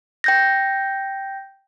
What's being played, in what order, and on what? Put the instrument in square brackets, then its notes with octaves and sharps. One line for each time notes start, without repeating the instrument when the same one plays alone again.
[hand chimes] G5 G6 A#6